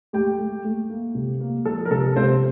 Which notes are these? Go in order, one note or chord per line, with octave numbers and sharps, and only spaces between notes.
A3 G4 G5
A3
A3
A#3
C3
A#3
F3 A4
A#4
C3 A4
C3 C4 C5